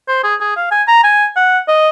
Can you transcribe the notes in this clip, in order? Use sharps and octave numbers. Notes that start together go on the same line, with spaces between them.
C5
G#4
G#4
F5
G#5
A#5
G#5
F#5
D#5